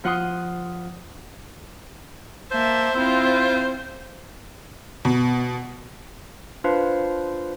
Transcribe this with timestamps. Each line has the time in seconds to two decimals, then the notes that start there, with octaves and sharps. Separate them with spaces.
0.04 F3 F4 F#5 C6 D#6
2.52 A#3 C5 E5 A5
2.96 C4 E4 F4
5.05 B2
6.64 D4 F4 B4 C5 F5